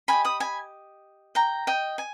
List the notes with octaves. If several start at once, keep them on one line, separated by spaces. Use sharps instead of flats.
G4 A#4 D#5 G#5 B5
B5 D#6
G#5 B5
G5 A#5
D#5 G5
G#5